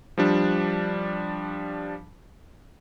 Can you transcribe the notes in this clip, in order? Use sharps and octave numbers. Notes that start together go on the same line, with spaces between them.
F3 G3 D4